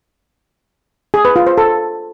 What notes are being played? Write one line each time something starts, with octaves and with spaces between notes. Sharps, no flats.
G#4
B4
F4
C5
A4